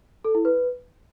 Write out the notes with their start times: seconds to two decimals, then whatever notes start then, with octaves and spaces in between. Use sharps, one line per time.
0.25 A4
0.35 E4
0.45 B4